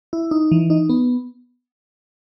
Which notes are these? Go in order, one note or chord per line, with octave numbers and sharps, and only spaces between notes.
E4
D#4
E3
D#4
B3